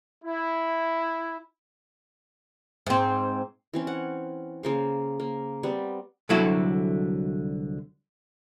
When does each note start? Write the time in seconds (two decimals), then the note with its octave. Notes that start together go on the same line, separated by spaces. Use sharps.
0.23 E4
2.87 G#2 C4
3.73 E3 C4 C#4
3.87 F#5
4.63 C#3 A#3 C5
5.20 A#3
5.63 G3 B3 C4
6.29 C2 D3 F#3 E4 F#4 A4